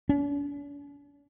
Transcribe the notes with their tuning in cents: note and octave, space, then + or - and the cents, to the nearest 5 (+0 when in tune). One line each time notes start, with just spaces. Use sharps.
D4 -45